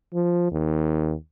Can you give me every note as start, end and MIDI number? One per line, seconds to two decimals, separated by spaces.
0.14 0.48 53
0.52 1.13 39